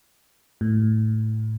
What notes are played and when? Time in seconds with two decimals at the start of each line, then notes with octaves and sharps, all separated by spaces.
0.61 A2